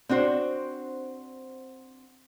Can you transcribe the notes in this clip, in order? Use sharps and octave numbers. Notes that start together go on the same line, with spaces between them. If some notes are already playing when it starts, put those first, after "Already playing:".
C4 D4 F#4 C5